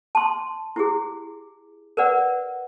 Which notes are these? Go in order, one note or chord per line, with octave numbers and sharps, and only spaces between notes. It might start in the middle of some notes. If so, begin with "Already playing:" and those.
A5 C6
E4 G4 G#4
A#4 B4 D5 F#5